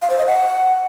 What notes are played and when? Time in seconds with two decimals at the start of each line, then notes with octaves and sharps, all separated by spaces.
0.02 F5
0.10 C5
0.18 D#5
0.26 F#5